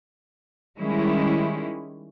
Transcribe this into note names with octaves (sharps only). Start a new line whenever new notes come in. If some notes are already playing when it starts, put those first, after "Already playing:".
D#3 G3 G#3 C#4 E4